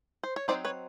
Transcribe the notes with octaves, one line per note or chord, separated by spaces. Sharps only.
C5
C#5
F#3 A3 C4 D#4 C5 D5
B4 C#5